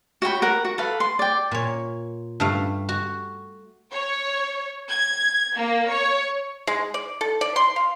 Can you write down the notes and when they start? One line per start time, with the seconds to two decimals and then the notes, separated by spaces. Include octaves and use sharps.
0.22 F#4 C#5 G5 B5
0.42 A#4 F#5
0.65 F#4
0.78 A4 B4 F5
1.00 C6
1.19 D5 G5
1.51 A#2 C#5
2.40 G2 A3 F5
2.89 F#4
3.92 C#5
4.90 G#6
5.56 A#3
5.92 C#5
6.67 G#3
6.94 D5
7.21 A4
7.41 D5
7.56 C6
7.76 F5